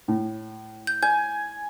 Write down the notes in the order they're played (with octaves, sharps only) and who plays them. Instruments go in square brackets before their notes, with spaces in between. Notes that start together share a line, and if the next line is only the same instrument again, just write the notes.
[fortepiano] A2
[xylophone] G6
[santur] G#5 [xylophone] G6